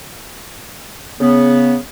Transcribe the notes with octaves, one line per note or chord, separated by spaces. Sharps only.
C#3 B3